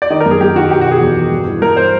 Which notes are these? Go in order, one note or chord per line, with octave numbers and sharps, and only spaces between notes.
D5
D#3 D#5
A#4
F#2
G#4
F#2 G4
D#3 F#4
B2 G4
B2 F#4
G#4
E2
B2
G2
E3
G2 A#4
C5